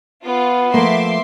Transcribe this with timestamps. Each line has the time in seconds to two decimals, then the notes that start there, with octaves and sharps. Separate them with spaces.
0.25 B3 F4
0.74 F3 A3 A#3 E5 C6 D6